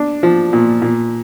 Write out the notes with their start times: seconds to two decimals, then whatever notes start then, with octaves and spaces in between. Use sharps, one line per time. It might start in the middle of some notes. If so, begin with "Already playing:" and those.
Already playing: D4
0.23 F3
0.53 A#2
0.82 A#2